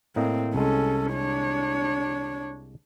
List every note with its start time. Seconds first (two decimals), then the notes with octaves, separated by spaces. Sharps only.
0.16 A2 A#3 C4 D#5
0.55 C2 G#3 C#4 A4
1.13 D4 C#5